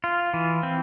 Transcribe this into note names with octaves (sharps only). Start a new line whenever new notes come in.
F4
E3
C4